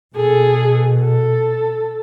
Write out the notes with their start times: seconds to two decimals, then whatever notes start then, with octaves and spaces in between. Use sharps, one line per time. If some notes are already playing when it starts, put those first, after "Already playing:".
0.16 B2 G#4 A4
1.00 A4